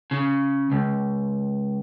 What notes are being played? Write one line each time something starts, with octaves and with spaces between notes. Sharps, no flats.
C#3
C#2